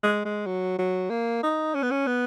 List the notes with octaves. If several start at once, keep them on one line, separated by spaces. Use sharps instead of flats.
G#3
G#3
F#3
F#3
A#3
D#4
C#4
B3
C#4
B3